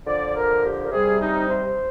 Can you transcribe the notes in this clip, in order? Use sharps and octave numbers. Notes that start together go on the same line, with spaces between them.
D3 F3 D5
A#4
G4
A#4
C3 G3 G#4
D#4
C5